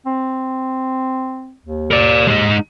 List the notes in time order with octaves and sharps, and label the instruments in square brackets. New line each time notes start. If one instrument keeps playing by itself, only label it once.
[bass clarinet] C4
D#2
[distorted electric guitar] A#4 D5
G#3 D#4